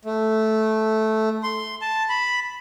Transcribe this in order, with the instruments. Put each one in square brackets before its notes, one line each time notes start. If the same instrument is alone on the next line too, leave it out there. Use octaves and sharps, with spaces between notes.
[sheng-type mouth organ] A3
C6
A5
B5